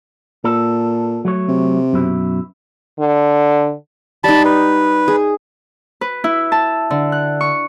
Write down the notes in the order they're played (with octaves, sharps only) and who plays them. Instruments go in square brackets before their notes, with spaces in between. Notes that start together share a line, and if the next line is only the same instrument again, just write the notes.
[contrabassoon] A#2 [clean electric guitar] A4
[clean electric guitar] F#3 A3 C#5
[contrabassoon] C3
[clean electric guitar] F#2 B2 E4
[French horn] D3
[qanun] G3 D#4 [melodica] A5 B5
[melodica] B4
[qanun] G#4
[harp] B4
E4
A5
D3
F#6
C#6